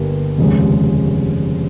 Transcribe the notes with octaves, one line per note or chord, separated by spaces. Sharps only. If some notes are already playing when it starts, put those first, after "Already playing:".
Already playing: G1 G2 G3 A#3
F1 D#2 C#3 G#3